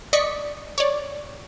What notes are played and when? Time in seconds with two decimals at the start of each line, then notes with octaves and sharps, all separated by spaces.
0.13 D5 D#5 C#6 B6 C#7
0.78 C#5 D5